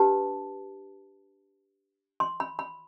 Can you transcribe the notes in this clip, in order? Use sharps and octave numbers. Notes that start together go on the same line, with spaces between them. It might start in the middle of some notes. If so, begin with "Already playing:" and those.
Already playing: D4 G4 B4 A5
C6
B5
B5